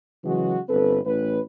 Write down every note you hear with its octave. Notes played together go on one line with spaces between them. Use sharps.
C#3 E3 F#3 G#3 F#4
G1 C4 A4 B4
A1 B4